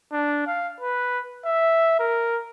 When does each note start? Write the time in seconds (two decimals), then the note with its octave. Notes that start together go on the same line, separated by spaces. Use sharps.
0.12 D4
0.47 F5
0.81 B4
1.45 E5
1.99 A#4